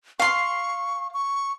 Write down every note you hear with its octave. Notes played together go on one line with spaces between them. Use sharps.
F5 C6 C#6
C#6